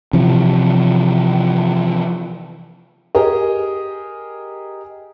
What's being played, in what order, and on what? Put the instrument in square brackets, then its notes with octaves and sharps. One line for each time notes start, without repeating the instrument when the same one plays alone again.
[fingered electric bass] C3 E3 F3
[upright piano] G4 G#4 A#4 D#5